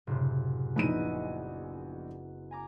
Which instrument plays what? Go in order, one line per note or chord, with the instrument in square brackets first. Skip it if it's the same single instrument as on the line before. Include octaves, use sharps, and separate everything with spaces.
[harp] F#1 A2 C3
[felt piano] A#1 D#4 D#7 [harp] B3 E4 D#5
[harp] G#5 A#5 D6